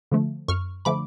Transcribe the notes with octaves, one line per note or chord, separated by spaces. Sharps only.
D3 F3 A3
F#2 C#6 F6
D3 F3 A3 B5 D6